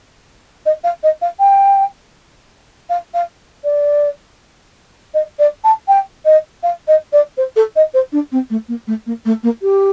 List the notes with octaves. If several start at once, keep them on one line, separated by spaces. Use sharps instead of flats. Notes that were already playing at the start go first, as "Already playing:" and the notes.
D#5
F5
D#5
F5
G5
F5
F5
D5
D#5
D5
A5
G5
D#5
F5
D#5
D5
C5
A4
D#5
C5
D4
C4
A3
A#3
A3
A#3
A3
A#3
G4